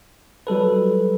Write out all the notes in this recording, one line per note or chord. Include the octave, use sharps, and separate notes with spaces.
F#3 G3 A4 B4